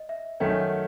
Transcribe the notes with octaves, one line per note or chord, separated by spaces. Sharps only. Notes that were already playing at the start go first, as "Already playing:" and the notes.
Already playing: D#5
E5
F#2 D#3 A3 C#4 D#5
F#5